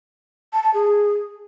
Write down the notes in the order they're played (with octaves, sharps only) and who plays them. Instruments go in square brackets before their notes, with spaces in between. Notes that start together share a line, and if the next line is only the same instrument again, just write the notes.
[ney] A5
A5
G#4